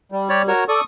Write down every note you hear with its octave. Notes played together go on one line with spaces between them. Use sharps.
G3
G4 C#5 D5
F#4 A#4 C#5
A4 D5 C#6 D#6